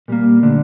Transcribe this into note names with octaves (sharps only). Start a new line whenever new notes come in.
A#2 G3 A#3
D3 A3 D4